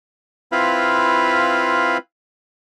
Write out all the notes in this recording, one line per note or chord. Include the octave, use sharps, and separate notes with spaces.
C4 E4 F4 B4 F5 B5